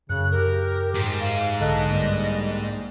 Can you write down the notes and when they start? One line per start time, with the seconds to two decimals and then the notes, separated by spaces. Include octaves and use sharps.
0.10 F#2 C#3 F#6
0.31 G4 A#4
0.95 G#2
1.20 F5
1.60 B1 D3 A4 D#5 F#6
1.90 G2 G3 A#3